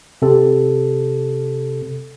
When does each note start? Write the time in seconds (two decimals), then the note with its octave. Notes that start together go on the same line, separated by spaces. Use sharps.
0.22 C3 A4